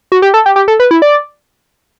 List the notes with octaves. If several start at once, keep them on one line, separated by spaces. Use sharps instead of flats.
F#4
G4
A4
G4
G4
A4
B4
E4
D5